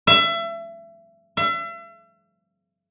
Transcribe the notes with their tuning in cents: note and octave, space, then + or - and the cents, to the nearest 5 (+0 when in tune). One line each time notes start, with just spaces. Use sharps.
E5 +30
E5 +40